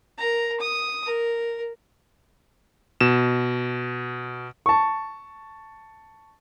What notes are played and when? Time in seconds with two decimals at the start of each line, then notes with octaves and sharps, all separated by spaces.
0.18 A#4 A#5
0.60 D#6
1.06 A#4
3.01 B2 E7
4.66 A5 C#6